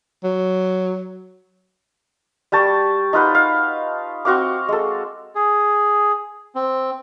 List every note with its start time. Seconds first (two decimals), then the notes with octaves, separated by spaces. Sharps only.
0.24 F#3
2.52 G3 G5 A5 C#6
3.13 D#4 F4 B4 F#5
3.35 F5
4.25 C4 F#4 F5 D6
4.69 G#3 A4
5.35 G#4
6.55 C4